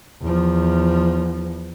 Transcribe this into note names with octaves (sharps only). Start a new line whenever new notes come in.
E2 F3